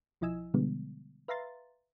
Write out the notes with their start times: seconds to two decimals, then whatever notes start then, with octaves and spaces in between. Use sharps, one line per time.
0.21 B1 F3 E4 D#5 G#5 E6
0.54 B2 D3 F3 G3 G#3 B3
1.28 B4 E5 F5 A#5 C6 A6